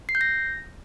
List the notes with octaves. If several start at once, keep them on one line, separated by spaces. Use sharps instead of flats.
C7
G6
A#6